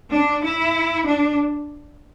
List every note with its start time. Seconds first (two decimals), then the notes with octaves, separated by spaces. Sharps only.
0.11 D4
0.43 E4
1.07 D4